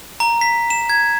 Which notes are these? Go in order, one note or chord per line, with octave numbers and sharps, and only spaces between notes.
A#5
B6
E7
G#6